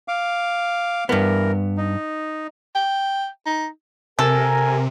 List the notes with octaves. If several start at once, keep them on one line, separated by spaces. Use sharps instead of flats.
F5 D6
G2 E3 B3 A#4
D#4
G5
D#4
C3 A4 A#4 G#5